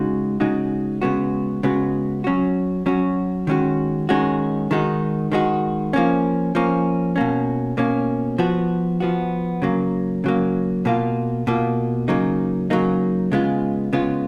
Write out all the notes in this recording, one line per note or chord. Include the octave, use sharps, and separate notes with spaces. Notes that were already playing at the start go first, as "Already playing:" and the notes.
Already playing: C#3 G#3 D#4 F#4
C#3 G#3 D#4 F#4
C#3 G#3 B3 F#4
C#3 G#3 B3 F#4
F#3 C#4 F#4
F#3 C#4 F#4
D#3 G#3 C#4 F#4
D#3 G#3 C#4 F#4
D#3 G#3 D#4 F#4
D#3 G#3 D#4 F#4
F3 A#3 C#4
F3 A#3 C#4
B2 A#3 C#4
B2 A#3 C#4
F3 B3 F#4
F3 B3 F#4
C#3 F#3 A#3
C#3 F#3 A#3
B2 A#3 F4
B2 A#3 F4
C#3 F#3 A#3 D#4
C#3 F#3 A#3 D#4
C#3 G#3 B3 F4
C#3 G#3 B3 F4